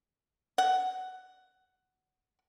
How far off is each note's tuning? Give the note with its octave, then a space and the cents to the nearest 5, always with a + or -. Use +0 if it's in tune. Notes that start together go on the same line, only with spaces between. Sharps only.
F#5 +10